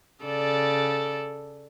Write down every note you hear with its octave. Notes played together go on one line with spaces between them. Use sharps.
C#3 A4 D5